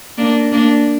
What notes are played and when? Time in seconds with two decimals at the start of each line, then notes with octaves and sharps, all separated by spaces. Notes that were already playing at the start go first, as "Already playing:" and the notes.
0.17 A#3 D4
0.52 A#3 D4